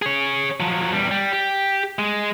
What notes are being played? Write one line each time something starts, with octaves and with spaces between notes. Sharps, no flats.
G#4 C#5
F3 F#3
E2 G3
G3
G4
G#3